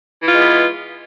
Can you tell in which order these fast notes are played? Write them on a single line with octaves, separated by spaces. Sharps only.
E3 F4 G#3 B3